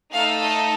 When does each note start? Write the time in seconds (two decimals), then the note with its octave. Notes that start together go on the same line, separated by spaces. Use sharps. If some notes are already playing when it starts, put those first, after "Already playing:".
0.13 A3 D#4 A4 F5
0.41 D#5